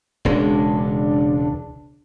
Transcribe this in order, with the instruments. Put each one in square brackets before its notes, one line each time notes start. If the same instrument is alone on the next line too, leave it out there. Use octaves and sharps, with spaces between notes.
[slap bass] E1 C#2 G#3 [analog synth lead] D4